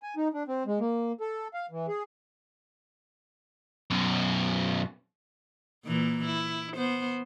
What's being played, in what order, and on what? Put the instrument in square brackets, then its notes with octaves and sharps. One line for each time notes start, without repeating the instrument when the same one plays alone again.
[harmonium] G#5
D#4
D4
C4
G#3
A#3
A4
F5
E3
G#4
[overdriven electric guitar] F#2 B2
[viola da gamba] A#2 E3 A#3
E4
B3 C5